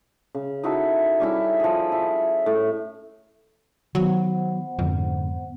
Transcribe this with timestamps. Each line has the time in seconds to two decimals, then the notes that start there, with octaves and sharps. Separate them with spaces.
0.35 C#3
0.63 D#4 E4 F#4 A4
1.20 G3 C#4 E4
1.60 F3 G#4
1.92 E4
2.46 A2
3.95 D#3 F#3 B3 C5 F#5
4.79 F2 G#2 D3